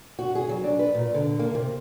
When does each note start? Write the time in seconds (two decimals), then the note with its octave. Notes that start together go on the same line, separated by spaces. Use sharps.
0.19 F#4
0.35 G#4
0.49 F#3
0.64 D4
0.79 B4
0.95 A#2
1.14 D3
1.39 A#3
1.55 C3